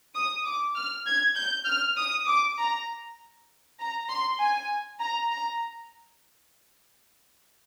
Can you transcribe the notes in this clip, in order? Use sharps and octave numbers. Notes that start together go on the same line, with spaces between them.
D#6
D6
F6
G#6
G6
F6
D#6
D6
A#5
A#5
C6
G#5
A#5
A#5